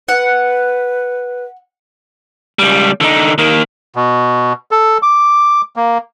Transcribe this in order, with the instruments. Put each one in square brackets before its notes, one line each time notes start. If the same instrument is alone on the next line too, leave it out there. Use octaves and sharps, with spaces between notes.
[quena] B4 [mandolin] F#5
[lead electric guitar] C#2 G3
D3 D#4
D#3 A#3
[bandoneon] B2
A4
D6
A#3